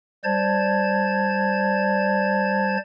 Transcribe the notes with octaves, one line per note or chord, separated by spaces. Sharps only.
G3 C5 D5 A5 G#6